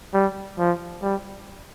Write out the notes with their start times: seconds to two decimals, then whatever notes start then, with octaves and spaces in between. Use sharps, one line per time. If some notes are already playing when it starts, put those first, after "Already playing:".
0.14 G3
0.59 F3
1.02 G3